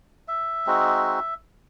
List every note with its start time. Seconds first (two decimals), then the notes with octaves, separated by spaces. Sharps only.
0.28 E5
0.66 G#3 C4 D#4 F#4